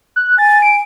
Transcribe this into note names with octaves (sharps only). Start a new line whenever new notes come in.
F#6
G#5 A6
D7